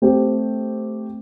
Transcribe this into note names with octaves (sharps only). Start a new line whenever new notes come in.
A3 C4 G4